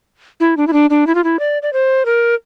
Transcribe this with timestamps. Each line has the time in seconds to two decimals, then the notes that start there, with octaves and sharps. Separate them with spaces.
0.40 E4
0.57 D4
0.67 E4
0.73 D4
0.90 D4
1.07 E4
1.15 F4
1.24 E4
1.39 D5
1.62 D5
1.73 C5
2.06 A#4